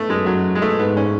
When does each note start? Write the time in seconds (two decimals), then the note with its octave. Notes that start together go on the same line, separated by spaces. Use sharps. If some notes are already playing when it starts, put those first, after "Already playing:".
Already playing: A3 B3
0.09 F#2 G#3
0.26 F#3
0.55 G#3
0.62 A3
0.79 G#2 B3
0.97 C#4